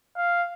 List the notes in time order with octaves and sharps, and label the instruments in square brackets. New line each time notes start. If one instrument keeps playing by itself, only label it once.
[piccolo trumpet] F5